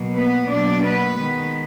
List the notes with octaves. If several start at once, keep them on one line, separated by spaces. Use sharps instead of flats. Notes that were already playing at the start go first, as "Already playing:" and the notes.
Already playing: B2 F#3 A#3
B3 B4
B2 F#3 A#3 D4 D5
B3 B4
D#3 G#3 B3